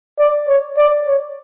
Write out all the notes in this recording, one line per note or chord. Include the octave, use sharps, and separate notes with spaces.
D5
C#5
D5
C#5